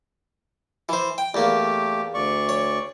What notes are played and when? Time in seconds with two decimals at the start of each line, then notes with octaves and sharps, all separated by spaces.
0.89 E3 C5
1.18 G5
1.34 E2 A3 A#3 G4
2.14 D2 D5 C#6
2.49 C#5